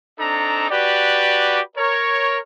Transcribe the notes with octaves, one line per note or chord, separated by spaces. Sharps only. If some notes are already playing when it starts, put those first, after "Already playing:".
C4 D4 D#4 A4 A#5
F#4 G4 B4 D5
A#4 C#5